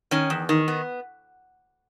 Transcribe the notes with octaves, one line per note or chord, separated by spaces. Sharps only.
D#3 C#4
E2
D#3
B3